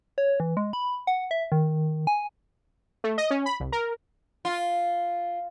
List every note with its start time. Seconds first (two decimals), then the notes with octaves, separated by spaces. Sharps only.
0.18 C#5
0.40 E3
0.57 G#3
0.73 B5
1.07 F#5
1.31 E5
1.52 D#3
2.07 G#5
3.04 A3
3.18 D#5
3.31 C#4
3.46 B5
3.60 C2
3.72 A#4
4.45 F4